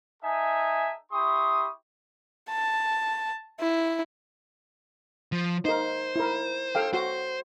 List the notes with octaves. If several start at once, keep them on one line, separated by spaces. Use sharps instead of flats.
D#4 A4 E5 G#5
E4 G4 C6 C#6 D#6
A5
E4
F3
D#4 A#4 C5
E4 A#4
A4 F5 G5
F#4 C5